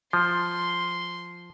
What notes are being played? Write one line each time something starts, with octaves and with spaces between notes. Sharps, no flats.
F3 C6